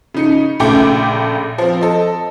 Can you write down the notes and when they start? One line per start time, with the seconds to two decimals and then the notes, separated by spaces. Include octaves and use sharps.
0.14 C#3 D#4 C#7
0.60 A#1 C#3 A3 G5 D6 G6
1.58 F3 C4
1.81 A4 D#5